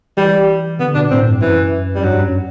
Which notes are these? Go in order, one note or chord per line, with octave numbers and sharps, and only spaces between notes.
E3 G3
D3 B3
B2 D4
A2 C4
G2
F#2 E3
F#2 G3
G2 F#3
F#2